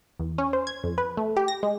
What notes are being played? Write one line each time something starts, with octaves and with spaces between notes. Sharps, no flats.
E2
C#4
C5
G#6
F2
B4
A3
G4
A#6
G#3